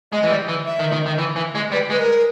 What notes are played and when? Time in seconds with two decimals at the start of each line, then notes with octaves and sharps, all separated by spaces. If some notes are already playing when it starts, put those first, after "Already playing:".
0.12 G#3 D#5
0.24 E3
0.30 G3
0.48 E3
0.66 E5
0.79 D#3
0.92 D#3
1.06 D#3
1.18 E3
1.36 E3
1.55 G#3
1.72 G3 B4
1.90 G#3 B4
1.99 A#4